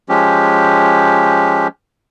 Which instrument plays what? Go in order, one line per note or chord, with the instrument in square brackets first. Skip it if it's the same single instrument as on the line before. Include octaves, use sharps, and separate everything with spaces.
[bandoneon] F3 G#3 C#4 G4